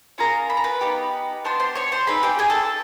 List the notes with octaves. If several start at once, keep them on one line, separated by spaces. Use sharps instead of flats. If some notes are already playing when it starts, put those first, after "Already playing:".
C#4 F4 G#4 A#4 A#5
B5
A#5
B4 B5
B3 D#4 G4
B3 D4 G4 C5 C6
C5 C6
C#5 C#6
C5 C6
C4 D#4 G#4 B4 B5
G4 G5
G#4 G#5
A4 A5